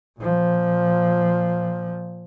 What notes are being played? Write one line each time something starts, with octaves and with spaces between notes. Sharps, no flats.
A#2 F3